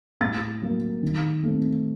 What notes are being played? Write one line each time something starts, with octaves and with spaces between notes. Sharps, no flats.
A2 A6
F#3 A#3
D#3
A3 C4